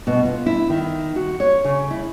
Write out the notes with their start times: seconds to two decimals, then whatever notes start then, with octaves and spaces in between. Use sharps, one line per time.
0.07 B2
0.25 F4
0.46 E4
0.70 D#3
1.16 F#4
1.40 C#5
1.65 C#3
1.91 E4